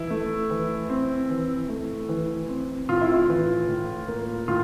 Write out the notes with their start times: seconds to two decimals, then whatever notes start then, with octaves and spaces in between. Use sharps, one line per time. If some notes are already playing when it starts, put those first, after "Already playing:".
Already playing: E3 E4
0.10 A3
0.50 E3
0.89 C4
1.30 E3
1.69 A3
2.09 E3
2.49 C4
2.89 A2 F4
3.01 E4
3.14 F4
3.29 E3
3.68 A2
4.08 A#3
4.48 A2 F4